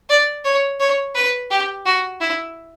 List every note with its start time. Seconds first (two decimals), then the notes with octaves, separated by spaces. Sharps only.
0.09 D5
0.45 C#5
0.80 C#5
1.15 B4
1.50 G4
1.86 F#4
2.21 E4